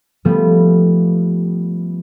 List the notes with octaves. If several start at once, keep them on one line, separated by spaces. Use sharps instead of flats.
F3 G3 A3 B3